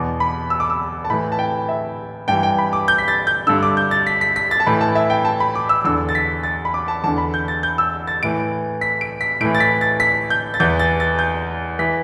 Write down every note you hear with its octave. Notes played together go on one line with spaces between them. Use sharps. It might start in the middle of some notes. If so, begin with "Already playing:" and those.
Already playing: E2 B2 D6
B5
E6
D6
E6
A5
A2 E3 B5
A5
G5
E5
G2 E3 G5
G5
B5
D6
G6
B6
A6
G6
G2 D3 E6
D6
G6
A6
B6
B6
B6
A6
A5
A2 E3 B5
A5
E5
G5
A5
B5
D6
E6
E2 D3 E6
A6
B6
A6
B5
D6
A5
E2 D3 A5
B5
G6
A6
G6
E6
A6
A2 E3 D7
B6
D7
B6
A2 E3 D7
A6
B6
A6
B6
G6
A6
E2 E3 G6
A6
A6
G6
E3 B6